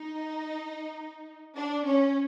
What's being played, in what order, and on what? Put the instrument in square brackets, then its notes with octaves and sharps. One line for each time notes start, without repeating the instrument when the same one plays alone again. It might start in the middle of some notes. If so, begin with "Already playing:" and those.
Already playing: [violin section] D#4
D4
C#4